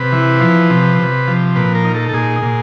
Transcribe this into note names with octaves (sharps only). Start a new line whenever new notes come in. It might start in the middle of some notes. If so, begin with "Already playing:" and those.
Already playing: C3 B4
E3
F3
C3
C3
F3
A#2 B4
A#4
D#4
A4
A4
A#2 G#4
A#2